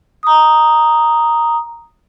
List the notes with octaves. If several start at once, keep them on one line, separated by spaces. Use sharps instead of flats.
A#5 D#6